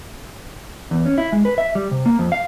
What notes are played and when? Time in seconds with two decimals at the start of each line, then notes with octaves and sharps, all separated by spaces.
0.91 E2
1.06 C#4
1.18 E4
1.32 G#3
1.45 B4
1.58 E5
1.75 G3
1.91 C3
2.06 A#3
2.19 F2
2.32 F5